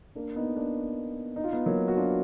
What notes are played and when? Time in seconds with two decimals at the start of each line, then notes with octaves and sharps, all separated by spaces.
0.15 A#3 D4
0.36 B3 D#4
0.56 A#3 D4
1.36 D#4
1.44 F4
1.52 B3 D#4
1.66 F#3 A#3
1.88 F#4
1.97 D4 F4